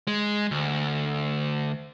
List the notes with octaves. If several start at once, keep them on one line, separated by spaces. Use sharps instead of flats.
G#3
D2